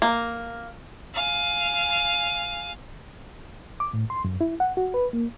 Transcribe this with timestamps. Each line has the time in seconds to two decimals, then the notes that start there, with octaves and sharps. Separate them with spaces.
0.02 A#3
1.15 F5 G#5
3.80 D6
3.93 A2
4.10 C6
4.24 F#2
4.41 E4
4.60 F#5
4.77 F#4
4.94 B4
5.13 A#3